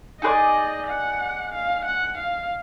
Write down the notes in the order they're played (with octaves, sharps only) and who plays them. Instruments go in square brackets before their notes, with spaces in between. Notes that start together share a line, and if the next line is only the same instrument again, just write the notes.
[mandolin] D#4 G#4 B4 D5 [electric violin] D#5
[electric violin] F#5
F5
F#5
F5